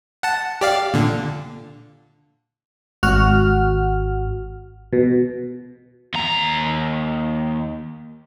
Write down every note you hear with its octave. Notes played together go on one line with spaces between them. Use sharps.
F#5 A5
G4 D5 F5
A#2 D3
G#1 F#4 F#5 F6
B2
D#2 A#5